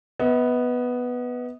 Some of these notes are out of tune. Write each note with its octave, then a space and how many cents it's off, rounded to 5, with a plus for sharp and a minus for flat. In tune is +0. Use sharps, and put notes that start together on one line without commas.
B3 +0 D#5 +45